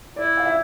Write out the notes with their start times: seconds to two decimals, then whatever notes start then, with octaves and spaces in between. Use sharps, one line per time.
0.16 E4 D5
0.37 F5
0.45 E5